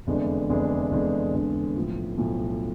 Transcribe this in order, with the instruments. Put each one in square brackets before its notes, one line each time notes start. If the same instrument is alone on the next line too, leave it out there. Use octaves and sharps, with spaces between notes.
[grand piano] F1 E2 D3 G#3 D4
F1 E2 D3 G#3 D4
F1 E2 D3 G#3 D4
F1 E2 D3 G#3 D4
B1 A2 F3
B1 A2 F3